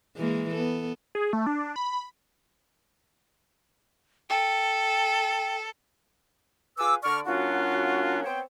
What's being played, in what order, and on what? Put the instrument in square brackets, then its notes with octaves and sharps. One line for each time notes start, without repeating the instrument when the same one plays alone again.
[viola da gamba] E3 G#3 A#3
B3 A4
[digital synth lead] G#4
A3
D4
B5
[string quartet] A4 [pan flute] G5
[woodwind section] F4 G#4 B4 G#5 D6 E6
D3 D5 C#6 F6
F#3 A#3 C#4 D4 F4 F#4
B3 C4 C5 C#5 G5